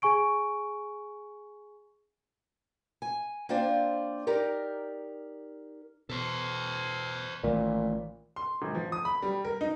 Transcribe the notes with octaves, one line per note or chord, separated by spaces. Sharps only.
G#4 G#5 C#6 D7
G#5
A#3 C4 D4 F4 C5 D5
D#4 G4 A#4 D5
B2 A4 C5
A1 A#2 D#3 A3
C6
G#1
F3
D#6
B5
G3
A#4
D#4